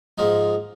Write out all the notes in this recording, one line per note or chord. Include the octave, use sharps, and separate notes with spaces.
G#2 F3 A#3 D#4